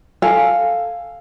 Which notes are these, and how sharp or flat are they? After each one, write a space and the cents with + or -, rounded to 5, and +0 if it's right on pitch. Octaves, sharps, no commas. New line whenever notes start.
A4 +10 F5 +0 G#5 +0